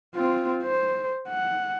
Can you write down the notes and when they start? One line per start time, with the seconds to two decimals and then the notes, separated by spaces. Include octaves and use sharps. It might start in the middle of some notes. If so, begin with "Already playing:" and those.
0.15 C4 F4
0.63 C5
1.28 F#5